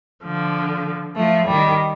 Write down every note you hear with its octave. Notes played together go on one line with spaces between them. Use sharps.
D3 F3
F3 A3
D#3 G3